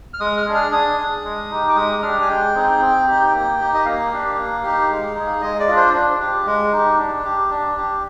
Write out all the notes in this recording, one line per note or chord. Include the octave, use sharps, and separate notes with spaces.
F6
G#3 D#6
F6
D4 G#4
F6
D4 D#6
G#4
G#3
D#4 G4
D6
G#3 D#6
D4 G4 F6
G#5
G#3 G5
C4 D#4 G#4
C4
D#4 G4
A#3
D#4 G4
D#5
A#3 F5
D4 G4
A#3
D#4 G4
G#3
D#4 G#4
G#3 D#5
D5
D4 F4
C5
D4
G4
G#3
D#4 G4
D4
G4
D4
G4